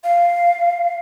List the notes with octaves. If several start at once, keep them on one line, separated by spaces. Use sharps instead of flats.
F5